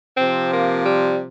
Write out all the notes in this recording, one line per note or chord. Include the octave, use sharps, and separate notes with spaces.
C3 F3 C4
A#3
G3